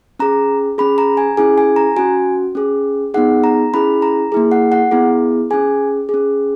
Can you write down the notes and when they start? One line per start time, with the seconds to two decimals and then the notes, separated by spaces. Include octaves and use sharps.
0.19 C#4 G#4 A#5
0.78 C#4 G#4 B5
0.98 A#5
1.17 G#5
1.37 C#4 E4 G#4 G#5
1.58 G#5
1.76 A#5
1.96 C#4 F#4 G#5
2.55 C#4 G#4
3.14 B3 D#4 G#4 F#5
3.44 A#5
3.74 C#4 E4 G#4 B5
4.02 A#5
4.32 A#3 E4 G#4
4.51 F#5
4.72 F#5
4.91 B3 E4 G#4
5.50 C#4 G#4 G#5
6.09 C#4 G#4